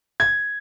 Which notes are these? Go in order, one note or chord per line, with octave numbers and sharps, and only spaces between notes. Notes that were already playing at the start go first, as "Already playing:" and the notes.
G#6